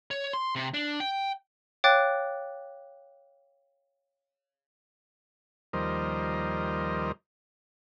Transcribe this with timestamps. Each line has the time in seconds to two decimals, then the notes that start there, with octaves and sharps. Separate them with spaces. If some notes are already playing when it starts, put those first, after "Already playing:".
0.11 C#5
0.33 C6
0.56 C3
0.74 D4
1.00 G5
1.84 C#5 F5 G5 D6 F#6 A6
5.73 D#2 F3 G3 A#4 C5 D#5